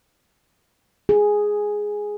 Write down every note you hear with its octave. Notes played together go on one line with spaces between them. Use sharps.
G#4